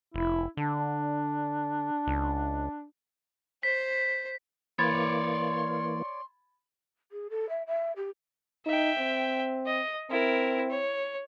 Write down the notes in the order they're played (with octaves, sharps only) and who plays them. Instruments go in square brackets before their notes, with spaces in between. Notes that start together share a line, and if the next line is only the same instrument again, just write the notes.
[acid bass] F1 [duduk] E4
[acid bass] D3 [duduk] D4
[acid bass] C#2
[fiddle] C5 [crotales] B6
[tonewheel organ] E3 A#3 [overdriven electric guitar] C#5 D5 [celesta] B5 G#6 A6 [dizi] C6
[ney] G#4
A4
E5
E5
G4
[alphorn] D#4 [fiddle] E5 G5
[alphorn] C4
[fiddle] D#5
[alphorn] C4 [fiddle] E4 A#4
[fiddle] C#5